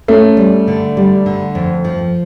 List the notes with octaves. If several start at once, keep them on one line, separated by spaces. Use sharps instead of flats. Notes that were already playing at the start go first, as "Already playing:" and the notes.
A3 C#4
G3
D3
G3
D3
F2
F3